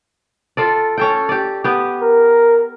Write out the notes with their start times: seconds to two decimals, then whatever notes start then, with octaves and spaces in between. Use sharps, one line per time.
0.57 F4 A4 D5
0.98 C#4 A4 G5
1.29 G4 D5
1.64 B3 G4
2.02 A#4